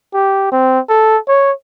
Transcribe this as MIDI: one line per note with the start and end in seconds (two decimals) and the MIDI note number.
0.14 0.48 67
0.52 0.80 60
0.90 1.18 69
1.28 1.52 73